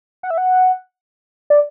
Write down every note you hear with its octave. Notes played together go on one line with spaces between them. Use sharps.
F#5
E5
F#5
D5